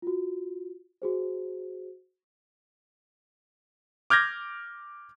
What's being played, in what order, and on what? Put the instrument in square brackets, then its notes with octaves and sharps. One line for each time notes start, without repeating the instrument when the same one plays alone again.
[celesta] F4 F#4
F#4 G#4 C5
[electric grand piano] D6 F6 G6 G#6 A#6